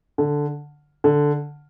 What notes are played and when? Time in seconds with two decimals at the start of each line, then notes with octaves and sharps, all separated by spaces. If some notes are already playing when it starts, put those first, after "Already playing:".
0.18 D3
1.04 D3